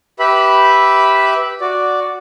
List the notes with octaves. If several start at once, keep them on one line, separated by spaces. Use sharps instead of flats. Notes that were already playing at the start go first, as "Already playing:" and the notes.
G4 B4 E5 B5
F#4 D5